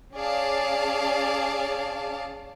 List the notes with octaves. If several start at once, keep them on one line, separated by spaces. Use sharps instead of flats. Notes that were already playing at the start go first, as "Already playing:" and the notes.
C#4 G#4 D5 F5 A5